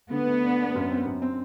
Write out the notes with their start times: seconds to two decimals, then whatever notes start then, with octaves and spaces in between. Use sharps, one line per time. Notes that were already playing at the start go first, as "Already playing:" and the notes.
0.11 D3 B3
0.26 A3
0.43 D4
0.59 D4
0.75 F#2
0.91 C4
1.06 F#2
1.22 C4